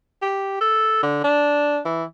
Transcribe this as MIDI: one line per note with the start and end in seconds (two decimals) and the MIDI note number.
0.22 0.57 67
0.61 0.99 69
1.03 1.20 50
1.24 1.80 62
1.85 2.04 52